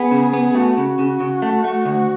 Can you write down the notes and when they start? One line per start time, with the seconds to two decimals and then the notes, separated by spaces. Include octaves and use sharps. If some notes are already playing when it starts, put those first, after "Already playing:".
Already playing: B3 G#4
0.11 C#3
0.33 B3
0.55 A3 F#4
0.77 C#3
0.99 C#3
1.20 C#3
1.42 A3
1.64 A3
1.85 D2